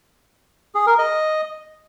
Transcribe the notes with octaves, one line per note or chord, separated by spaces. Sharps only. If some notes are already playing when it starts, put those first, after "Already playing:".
G#4
A#4
D#5